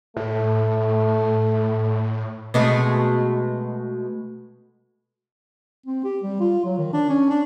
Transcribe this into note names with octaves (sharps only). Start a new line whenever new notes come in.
A2 A3
B2 G#3 A3
C4
G4
G3
F4
F#3
D#3
D4
C#4
D4